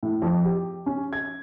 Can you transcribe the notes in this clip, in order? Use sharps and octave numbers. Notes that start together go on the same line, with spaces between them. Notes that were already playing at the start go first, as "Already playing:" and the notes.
A2
F2
G4
C#4
G#6